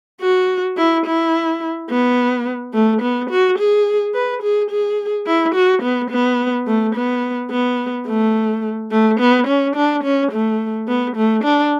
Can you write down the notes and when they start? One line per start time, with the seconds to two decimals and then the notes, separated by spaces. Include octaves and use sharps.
0.21 F#4
0.77 E4
1.06 E4
1.90 B3
2.74 A3
3.02 B3
3.30 F#4
3.59 G#4
4.14 B4
4.43 G#4
4.71 G#4
5.27 E4
5.55 F#4
5.83 B3
6.11 B3
6.67 A3
6.95 B3
7.51 B3
8.07 A3
8.91 A3
9.20 B3
9.48 C#4
9.76 D4
10.04 C#4
10.32 A3
10.88 B3
11.16 A3
11.44 D4